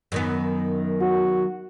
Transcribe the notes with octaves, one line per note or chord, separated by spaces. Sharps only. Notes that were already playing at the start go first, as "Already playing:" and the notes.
F#2 D#3 B3
F#4